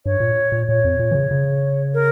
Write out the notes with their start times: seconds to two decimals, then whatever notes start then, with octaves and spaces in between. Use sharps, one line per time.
0.06 G2 C#5
0.20 A#2
0.52 A#2
0.68 A#2 C#5
0.85 F2
0.99 A#2
1.11 E3
1.15 C#3
1.31 C#3
1.94 A#4